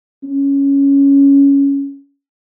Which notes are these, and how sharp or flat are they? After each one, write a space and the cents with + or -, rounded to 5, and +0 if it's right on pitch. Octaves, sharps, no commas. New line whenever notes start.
C#4 +5